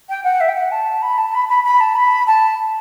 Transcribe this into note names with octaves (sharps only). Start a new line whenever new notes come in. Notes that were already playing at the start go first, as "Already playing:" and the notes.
G5
F#5
E5
G5
F#5
A5
B5
A5
B5
B5
B5
A5
B5
A5